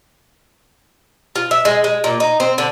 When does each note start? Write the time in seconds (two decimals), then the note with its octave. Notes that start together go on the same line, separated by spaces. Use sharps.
1.36 F4
1.51 E5
1.65 G#3
1.84 G#3
2.04 A#2
2.20 D#4
2.40 C4
2.58 D3